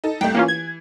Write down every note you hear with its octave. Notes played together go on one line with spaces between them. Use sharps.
D#4 A4
C2 A3 G5
E3 A#3 C#4 F4
G#6